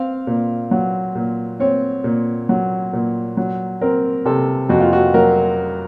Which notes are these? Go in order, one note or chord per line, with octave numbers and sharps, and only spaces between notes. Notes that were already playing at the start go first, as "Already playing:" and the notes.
Already playing: C4 F5
A#2
F#3
A#2
C4 C#5
A#2
F#3
A#2
F#3
C4 A#4
C3 A4
F2 F#4
F4
F#4
F#3 A#4